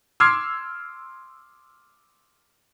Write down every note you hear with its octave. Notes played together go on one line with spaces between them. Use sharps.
C6 D6 E6 F6 G#6 C7